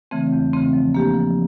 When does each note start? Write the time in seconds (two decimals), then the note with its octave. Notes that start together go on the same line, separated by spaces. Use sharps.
0.11 C#3 E3 A3 C4
0.33 E2
0.53 C#3 E3 A3 C4
0.73 F3
0.95 A#3 D4 G4
1.15 F3